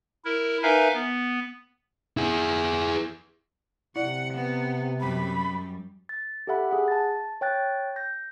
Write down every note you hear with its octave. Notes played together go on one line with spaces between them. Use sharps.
E4 A#4
D#4 A#4 B4 E5 F5 G#5
B3
E4 G#4
C3 E4 D5 F#5
B3 F#5
F#2 G3 B5
A6
G4 A4 E5 F#5 B5
G#4 F#5
A5 A6
C#5 G5 F#6 A6
G6 A#6